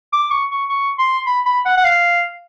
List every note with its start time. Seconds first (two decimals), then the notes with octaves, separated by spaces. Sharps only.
0.13 D6
0.31 C#6
0.51 C#6
0.69 C#6
0.98 C6
1.27 B5
1.46 B5
1.66 F#5
1.77 F#5
1.84 F5